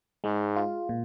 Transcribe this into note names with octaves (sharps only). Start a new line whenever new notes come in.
G#2 G#3
F4
A#2